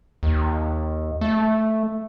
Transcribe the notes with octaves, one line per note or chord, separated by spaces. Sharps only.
D#2
A3